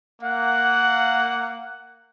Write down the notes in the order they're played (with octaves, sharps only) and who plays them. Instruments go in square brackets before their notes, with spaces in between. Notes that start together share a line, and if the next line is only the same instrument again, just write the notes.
[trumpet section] A#3 F#5